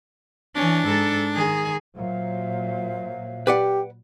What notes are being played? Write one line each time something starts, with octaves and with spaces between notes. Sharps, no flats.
E3 C#4 D4
G#2 A4
D#3 G#4
A#2 F#3 C5 E5 F5
G4 B4 D5 F#5